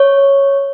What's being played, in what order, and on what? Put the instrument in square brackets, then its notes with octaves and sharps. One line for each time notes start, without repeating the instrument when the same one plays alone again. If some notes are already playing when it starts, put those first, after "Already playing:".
Already playing: [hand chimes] C#5